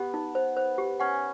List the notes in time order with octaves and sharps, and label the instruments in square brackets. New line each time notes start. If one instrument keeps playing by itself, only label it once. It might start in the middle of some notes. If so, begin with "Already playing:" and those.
Already playing: [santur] B3 [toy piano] G4
[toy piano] D#4
C5
C5
G4
[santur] C#4 [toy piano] F#5